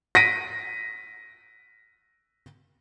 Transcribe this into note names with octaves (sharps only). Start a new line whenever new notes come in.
A#6 B6 D7 D#7